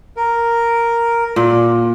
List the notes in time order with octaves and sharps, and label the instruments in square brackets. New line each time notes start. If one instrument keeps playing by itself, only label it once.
[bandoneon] A#4
[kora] A#2